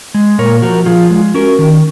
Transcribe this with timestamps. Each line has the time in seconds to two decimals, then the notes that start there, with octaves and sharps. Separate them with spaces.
0.14 G#3
0.38 A#2 A#4 C#5
0.62 F3 F#4 A#4
0.86 F3 F4 G#4
1.11 G#3
1.34 C#4 F#4 A#4
1.59 D#3